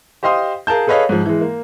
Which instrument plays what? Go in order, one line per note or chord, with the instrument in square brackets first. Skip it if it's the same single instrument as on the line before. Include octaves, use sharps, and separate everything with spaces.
[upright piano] G4 C5 D#5 F5 C6 D#6
G#4 A#4 F5 A5 G6
G#4 A4 B4 C#5 D#5 F5
G#2 F3
E3 G#3
A#3